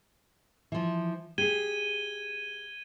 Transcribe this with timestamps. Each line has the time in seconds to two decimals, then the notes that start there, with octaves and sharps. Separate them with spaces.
0.72 E3 F3
1.38 G4 G#4 G#6 D#7 G7